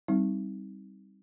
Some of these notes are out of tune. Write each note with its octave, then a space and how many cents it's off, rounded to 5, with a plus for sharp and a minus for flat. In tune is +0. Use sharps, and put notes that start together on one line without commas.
G3 +0 C4 +0 D#4 +20